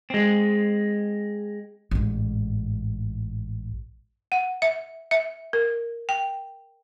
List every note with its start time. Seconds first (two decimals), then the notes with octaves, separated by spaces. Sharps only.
0.10 G#3 C4
1.91 A1 G#2
4.32 F#5
4.62 E5
5.11 E5
5.53 A#4
6.09 G5